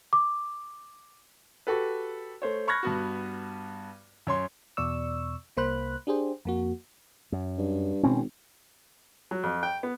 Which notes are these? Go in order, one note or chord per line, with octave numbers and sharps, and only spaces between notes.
D6
F#4 G4 A4 B4
A3 C5 C#5
B5 C#6 F6 F#6 G#6 A#6
G2 B3 F#4
F#2 C#5 C6
E2 B2 D5 C#6 E6
C2 A#3 C5 B5 F#6
D4 G4 G#4 C5
F2 A#3 F#4
F#2
G2
G#1 B2 C4 C#4
F#3
F2
G5
B3